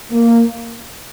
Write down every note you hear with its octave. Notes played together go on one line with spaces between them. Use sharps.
A#3